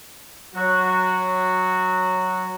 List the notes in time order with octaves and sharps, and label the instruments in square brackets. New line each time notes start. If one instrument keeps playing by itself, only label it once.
[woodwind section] F#3 F#4